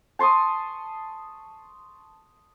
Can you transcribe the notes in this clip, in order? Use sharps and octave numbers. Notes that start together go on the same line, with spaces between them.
A5 C6 C#6 D#6